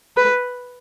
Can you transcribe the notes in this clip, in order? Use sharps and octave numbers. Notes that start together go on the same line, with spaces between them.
B4